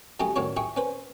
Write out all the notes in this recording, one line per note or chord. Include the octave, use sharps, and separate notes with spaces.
F#3 A3 C#4 G4 G#4
A1 E2 D3 D#3 F#4 C#5
E4 G#4 G5 C#6
C#4 B4 C5